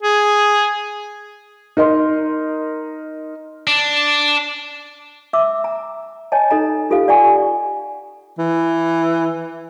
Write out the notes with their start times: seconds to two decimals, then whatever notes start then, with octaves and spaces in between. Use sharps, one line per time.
0.03 G#4
1.77 D#4 A#4 D#5 C6
3.67 D4
5.33 E5 D6 E6
5.64 A#5
6.32 C#5 D#5 G#5 A5
6.50 D#4 A4 D#5 A#5
6.90 F4 G4 A4 C5 F5
7.08 D5 F5 F#5 G#5 A#5 C#6
8.38 E3